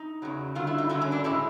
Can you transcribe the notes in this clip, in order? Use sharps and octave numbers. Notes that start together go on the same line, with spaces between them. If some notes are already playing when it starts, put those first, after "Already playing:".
Already playing: D#4
E2 C#3 F#3
G2 D3 F#3 F4
E4
D#4
G2 D3 F#3 D4
C#4
D4
A2 E3 G#3 E4